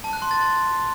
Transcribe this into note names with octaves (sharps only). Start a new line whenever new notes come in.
A5
F#6
C6
A6